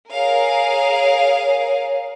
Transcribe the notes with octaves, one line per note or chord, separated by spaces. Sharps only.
G#4 A#4 C#5 F5